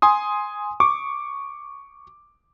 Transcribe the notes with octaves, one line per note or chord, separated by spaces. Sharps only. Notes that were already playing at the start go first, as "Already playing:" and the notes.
G#5 C6 D#6
C#6 D6